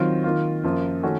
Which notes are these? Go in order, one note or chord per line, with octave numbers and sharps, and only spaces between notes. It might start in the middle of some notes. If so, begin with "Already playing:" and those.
Already playing: D#3 F#3 C4 F4
D#3 A#3 F4
F#2 F3 A#3 F4
D#3 A3 C#4 F#4